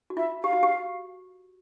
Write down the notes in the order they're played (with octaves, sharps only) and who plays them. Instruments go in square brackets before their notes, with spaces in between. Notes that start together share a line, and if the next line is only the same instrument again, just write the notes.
[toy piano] F#4
[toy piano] F4 [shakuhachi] E5
[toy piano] G4 [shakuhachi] F5
[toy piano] F#4
G4